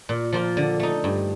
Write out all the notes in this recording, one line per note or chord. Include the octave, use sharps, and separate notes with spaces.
A#2
F3 A#3 F4
D3
A3 D#4
G2